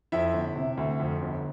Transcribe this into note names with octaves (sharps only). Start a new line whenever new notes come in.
F2 E4 E5
G1
C3
D2
F2
G1